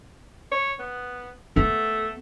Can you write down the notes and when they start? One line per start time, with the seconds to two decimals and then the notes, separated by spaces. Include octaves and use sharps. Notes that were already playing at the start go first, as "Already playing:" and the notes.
0.52 C#5
0.79 B3
1.56 A3 B3